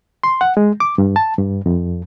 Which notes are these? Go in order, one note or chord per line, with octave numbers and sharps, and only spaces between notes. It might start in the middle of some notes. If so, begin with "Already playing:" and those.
C6
F#5
G#3
D6
G2
A5
G2
F2